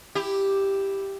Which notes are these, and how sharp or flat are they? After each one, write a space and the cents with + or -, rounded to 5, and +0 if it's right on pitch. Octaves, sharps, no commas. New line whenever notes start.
E4 +0 G4 +0